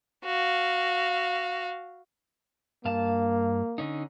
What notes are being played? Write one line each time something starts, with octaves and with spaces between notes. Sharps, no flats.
F#4 F5
G2 A#3 F5 A5
D3 C#4 D#4